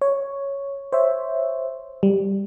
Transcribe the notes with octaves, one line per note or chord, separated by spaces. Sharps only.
C#5
C5 C#5 E5
G3